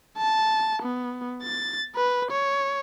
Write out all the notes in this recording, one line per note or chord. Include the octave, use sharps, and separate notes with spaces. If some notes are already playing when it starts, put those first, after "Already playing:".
A5
B3
A6
B4
C#5